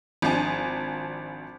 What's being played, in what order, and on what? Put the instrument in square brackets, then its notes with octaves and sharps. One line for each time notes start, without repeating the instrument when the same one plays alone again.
[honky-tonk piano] G#1 F3 D4 G#5